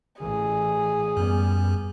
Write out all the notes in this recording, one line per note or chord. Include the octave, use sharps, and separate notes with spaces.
A1 E3 G#4
F#2 G3 B3